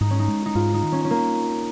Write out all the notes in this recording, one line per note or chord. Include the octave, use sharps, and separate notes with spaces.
G#2 D#4
C#4
D#4
G#3
D#4
G#2 F4
D#4
D#3
C#4
C#4
A#3